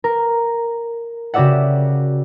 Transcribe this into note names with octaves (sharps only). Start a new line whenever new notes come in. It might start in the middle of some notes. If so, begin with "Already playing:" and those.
A#4
C#3 F#4 G4 D5 E5 F#5